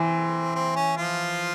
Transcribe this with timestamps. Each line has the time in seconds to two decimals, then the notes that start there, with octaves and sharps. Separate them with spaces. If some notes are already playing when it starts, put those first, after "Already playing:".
Already playing: E3 C4
0.55 C4
0.76 C#4
0.97 F3 F4